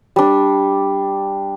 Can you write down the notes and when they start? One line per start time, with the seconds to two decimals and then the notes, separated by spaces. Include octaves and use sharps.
0.16 G3 D4